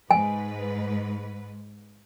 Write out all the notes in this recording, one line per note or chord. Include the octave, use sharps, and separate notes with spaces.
G#2 B4 G#5